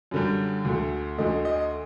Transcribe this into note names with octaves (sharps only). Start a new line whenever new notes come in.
F#2 D3 G3
D2 D3 A3
D2 D3 A3 D#5
D#5